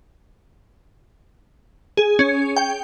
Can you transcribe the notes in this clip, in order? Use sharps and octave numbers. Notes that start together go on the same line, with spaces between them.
G#4
C#4
G5